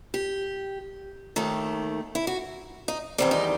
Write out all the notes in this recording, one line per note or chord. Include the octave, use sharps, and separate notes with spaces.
G4
D#2 D#3 A3
E4
F#4
D#4
E2 D#3 G3 C4
D#4